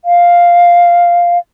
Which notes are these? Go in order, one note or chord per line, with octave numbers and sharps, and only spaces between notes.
F5